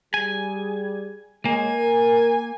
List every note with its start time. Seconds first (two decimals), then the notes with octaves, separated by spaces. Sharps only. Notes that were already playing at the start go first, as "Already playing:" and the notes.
0.14 G3 G#4 G#5
1.45 G#3 A#3 C#5 G#5
1.74 A#4